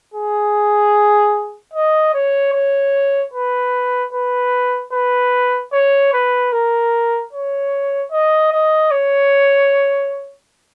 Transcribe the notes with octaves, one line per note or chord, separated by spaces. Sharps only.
G#4
D#5
C#5
C#5
B4
B4
B4
C#5
B4
A#4
C#5
D#5
D#5
C#5